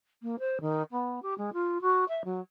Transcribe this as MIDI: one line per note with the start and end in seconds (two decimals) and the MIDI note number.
0.22 0.35 58
0.39 0.59 72
0.61 0.83 51
0.91 1.22 59
1.22 1.34 67
1.38 1.50 56
1.53 1.78 65
1.81 2.04 66
2.08 2.22 76
2.24 2.40 54